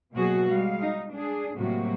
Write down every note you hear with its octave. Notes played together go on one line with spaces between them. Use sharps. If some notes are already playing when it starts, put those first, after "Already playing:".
B2 F#3 A#3 F#4 G#4
G3 G#3 F5
D#4
D4 G#4
A2 C3 F#3 G3 A#3 F#4